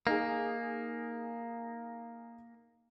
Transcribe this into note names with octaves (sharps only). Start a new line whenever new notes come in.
A#3 D#4 G#4